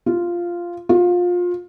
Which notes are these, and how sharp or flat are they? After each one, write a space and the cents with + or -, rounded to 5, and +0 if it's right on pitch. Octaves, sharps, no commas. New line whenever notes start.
F4 -5
F4 +25